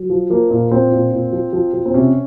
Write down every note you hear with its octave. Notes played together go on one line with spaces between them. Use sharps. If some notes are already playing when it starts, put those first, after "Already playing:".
Already playing: F#3
F3
F3 A#3
A#2
F3 C4
A#2
A#2
F3
F3
F3
C4
C3 C#4